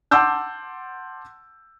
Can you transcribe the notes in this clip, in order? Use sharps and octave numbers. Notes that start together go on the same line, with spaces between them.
F#5 A5 C6 D6 E6 G6